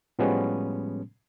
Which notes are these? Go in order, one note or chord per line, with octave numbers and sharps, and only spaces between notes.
A2 F3 G3 G#3 B3 C#4